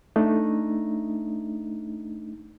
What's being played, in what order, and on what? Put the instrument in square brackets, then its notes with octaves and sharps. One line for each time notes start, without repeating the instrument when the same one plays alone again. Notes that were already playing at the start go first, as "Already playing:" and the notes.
[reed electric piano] A3 D4 D#4